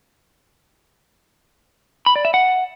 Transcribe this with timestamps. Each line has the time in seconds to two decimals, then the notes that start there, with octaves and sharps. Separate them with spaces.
2.06 B5
2.16 D5
2.25 E5
2.34 F#5